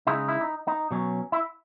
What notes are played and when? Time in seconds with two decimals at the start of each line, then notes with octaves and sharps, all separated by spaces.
0.07 C#3 G#3 D#4 E4
0.28 E4
0.41 D#4
0.67 D#4
0.91 B2 F#3 C#4
1.32 E4